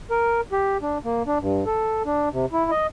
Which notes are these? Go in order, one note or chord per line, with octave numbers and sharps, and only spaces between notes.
A#4
G4
D4
A#3
D4
G2
A4
D4
C3
E4
D#5